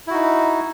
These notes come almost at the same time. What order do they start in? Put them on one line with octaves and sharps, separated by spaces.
E4 F#4 D#4